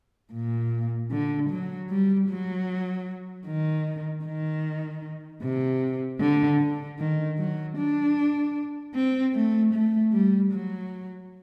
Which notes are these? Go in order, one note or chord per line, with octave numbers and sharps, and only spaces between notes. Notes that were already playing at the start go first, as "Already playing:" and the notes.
A#2
D3
F#3
G3
F#3
D#3
D#3
C3
D3
D3
D#3
F#3
D4
C4
A3
A3
G3
F#3